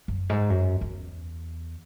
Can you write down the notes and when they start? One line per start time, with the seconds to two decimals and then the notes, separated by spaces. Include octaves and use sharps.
0.08 F#2
0.29 G#2
0.50 F#2
0.81 E2